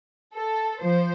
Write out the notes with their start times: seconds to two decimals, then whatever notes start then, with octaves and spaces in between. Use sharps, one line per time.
0.35 A4
0.82 F3 C5